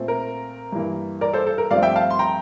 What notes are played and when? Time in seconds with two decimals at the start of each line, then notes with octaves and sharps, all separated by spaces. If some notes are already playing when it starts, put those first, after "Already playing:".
Already playing: A#2 A3 C4
0.08 A#4
0.72 G2 E3 A#3
1.21 A#4 D5
1.33 A4 C5
1.47 A4
1.58 A#4
1.71 G2 F3 A3 C4 D5 F5
1.83 E5 G5
1.96 F5 A5
2.10 C6
2.19 G5 A#5